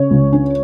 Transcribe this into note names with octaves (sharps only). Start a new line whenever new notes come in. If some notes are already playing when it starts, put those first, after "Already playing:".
Already playing: C#3 C#5
C#2
C#4